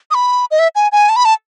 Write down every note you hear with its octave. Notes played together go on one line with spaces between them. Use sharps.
D#6
B5
D#5
E5
G#5
G#5
A5
B5
A5